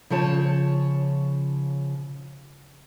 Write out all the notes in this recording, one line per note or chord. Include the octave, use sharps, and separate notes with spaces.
C#3 F3 C#5 A5